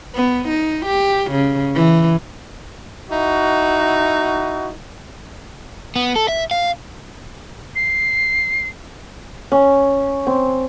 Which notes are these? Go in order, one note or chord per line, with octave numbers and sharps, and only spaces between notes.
B3
D#4
G4
C#3
E3
D#4 E4 F#4
B3
A4
E5
F5
C7
C#4
C4